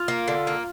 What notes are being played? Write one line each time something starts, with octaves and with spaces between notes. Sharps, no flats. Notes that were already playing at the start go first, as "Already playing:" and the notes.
Already playing: F4
A#3
D3
A#3